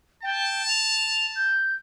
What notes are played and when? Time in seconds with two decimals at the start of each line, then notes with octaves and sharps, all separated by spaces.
0.23 G5 A5
0.68 F7
1.36 G6